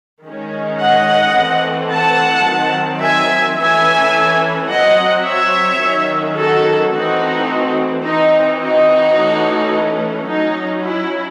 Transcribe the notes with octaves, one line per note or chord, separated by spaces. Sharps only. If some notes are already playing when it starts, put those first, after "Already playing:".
D#3 G#3 C#4
D#5 F#5
E3 A3 C4
F#5 A5
D#3 F#3 C4
E5 G#5
E3 A3 C#4 E5 G#5
F#3 C4 D#5 F#5
C#5 E5
D#3 F#3 C#4
F#4 A4
E3 A3 C4 D#4 F#4
E3 C4 D#4
D#4 F#4
E3 A3 C#4
F#3 C#4 D#4
E4